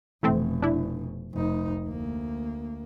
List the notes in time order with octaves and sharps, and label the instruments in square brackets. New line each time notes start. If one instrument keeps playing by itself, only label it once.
[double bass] F1 B2 [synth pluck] E3 A3 C4
[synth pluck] D4 E4
[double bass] F1 D#4
D2 A#3